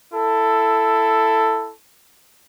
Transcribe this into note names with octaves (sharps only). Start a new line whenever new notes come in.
E4 A4